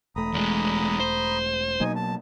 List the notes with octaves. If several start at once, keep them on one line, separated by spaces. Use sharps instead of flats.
E1 A3 A#5 B5 D#6
E2 G#3
C5
B2 F#3 A#3 D#4 G#5
A5